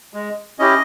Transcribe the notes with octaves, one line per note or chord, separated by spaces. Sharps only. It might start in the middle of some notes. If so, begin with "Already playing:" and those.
G#3
C#4 E4 G4 D#5